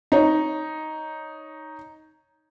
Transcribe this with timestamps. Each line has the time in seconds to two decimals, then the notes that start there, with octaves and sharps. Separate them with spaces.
0.12 D#4 C#5